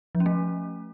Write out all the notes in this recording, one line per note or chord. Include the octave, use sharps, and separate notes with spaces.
F3
C#4
A3